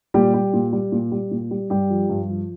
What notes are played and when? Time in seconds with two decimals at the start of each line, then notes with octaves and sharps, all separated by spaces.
0.14 A#2 G3 G4
0.34 G3
0.53 A#2
0.73 G3
0.92 A#2
1.12 G3
1.31 A#2
1.51 G3
1.70 G2 G3 G4
1.90 F3
2.10 G2
2.29 F3